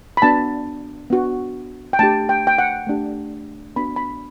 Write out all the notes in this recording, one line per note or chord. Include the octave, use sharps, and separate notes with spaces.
B5
B3 D4 F#4 A5
B3 D4 F#4
G5
A3 D4 G4 A5
G5
G5
F#5
A3 D4 G4
B3 D4 F#4 B5
B5